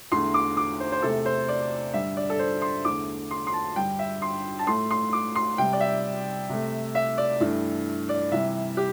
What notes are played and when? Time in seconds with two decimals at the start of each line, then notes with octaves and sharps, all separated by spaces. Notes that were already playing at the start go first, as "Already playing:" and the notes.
0.12 E2 D3 A3 C6
0.34 D6
0.57 D6
0.80 C5
0.92 C5
1.02 E2 C3 A3 A4
1.26 C5
1.48 D5
1.94 G2 D3 G3 E5
2.17 D5
2.30 A4
2.39 C5
2.62 C6
2.85 E2 D3 A3 D6
3.31 C6
3.47 C6
3.53 A5
3.76 G2 D3 G3 G5
3.99 E5
4.22 C6
4.59 A5
4.67 A2 A3 C6
4.91 C6
5.13 D6
5.35 C6
5.58 C3 G3 G5
5.73 D5
5.81 E5
6.49 C3 A3
6.95 E5
7.18 D5
7.40 G2 E3 A3
8.09 D5
8.32 C3 E3 G3 E5
8.77 G4